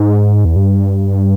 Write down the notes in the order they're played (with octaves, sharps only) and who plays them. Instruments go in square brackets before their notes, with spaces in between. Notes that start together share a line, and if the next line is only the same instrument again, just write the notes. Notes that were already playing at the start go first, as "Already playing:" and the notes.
Already playing: [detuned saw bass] G#2
E2
G2